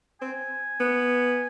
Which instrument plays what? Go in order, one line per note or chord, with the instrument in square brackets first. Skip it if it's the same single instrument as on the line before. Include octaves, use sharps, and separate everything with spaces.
[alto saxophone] C4 [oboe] G#5
[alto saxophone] B3